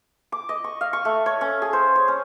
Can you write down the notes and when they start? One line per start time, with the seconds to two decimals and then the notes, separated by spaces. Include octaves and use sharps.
0.32 D6
0.49 D#5
0.64 C#6
0.81 F5
0.93 C#6
1.05 A3
1.26 C#5
1.41 C#4
1.62 G#4
1.73 C5
1.95 C#5
2.08 C#4